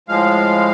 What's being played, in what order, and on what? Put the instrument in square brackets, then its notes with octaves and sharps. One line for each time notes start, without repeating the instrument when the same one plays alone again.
[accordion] A2 F3 G#3 F5